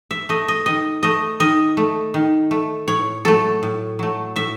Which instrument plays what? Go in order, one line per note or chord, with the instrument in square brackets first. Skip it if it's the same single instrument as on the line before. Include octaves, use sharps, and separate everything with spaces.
[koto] E5
A3 D#5
D#5
D#3 D#5
A3 D#5
D#3 D#5
A3
D#3
A3
A2 C#5
F#3 A3 A4
A2
F#3 A3
A2 E5